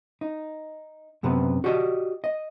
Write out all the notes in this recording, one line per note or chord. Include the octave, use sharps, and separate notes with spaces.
D#4
F#2 C3 B3 B4
F#4 G4 D5 D#5
D#5